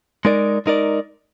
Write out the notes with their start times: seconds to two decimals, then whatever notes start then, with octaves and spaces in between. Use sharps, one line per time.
0.25 G#3 D#4 A#4 D5
0.66 G#3 D#4 A#4 D5